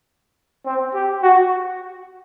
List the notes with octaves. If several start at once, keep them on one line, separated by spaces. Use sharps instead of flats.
C4
G4
F#4